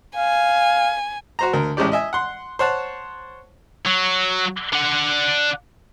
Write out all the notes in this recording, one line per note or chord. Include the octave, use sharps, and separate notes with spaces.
F5 G#5
F#4 C5 A#5
D2 A#4
A1 G#3 C#4 G4 D5
D#5 E5 G#5
F#5 C6
C5 C#5 F#5 A5
F#3
D4 F#5